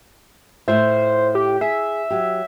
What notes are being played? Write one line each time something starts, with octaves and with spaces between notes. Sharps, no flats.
A2 F4 C5 E5
G4
G#4 E5
F#3 G4